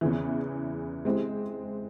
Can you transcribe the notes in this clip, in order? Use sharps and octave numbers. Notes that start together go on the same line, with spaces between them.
E2 C#3 E3
G#3 C4 E4 G4